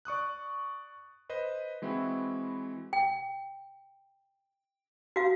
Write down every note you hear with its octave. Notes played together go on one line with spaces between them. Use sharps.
D5 C#6 D#6 F#6
B4 C5 D#5
E3 G#3 C4 E4 F#4
G5
F#4 F5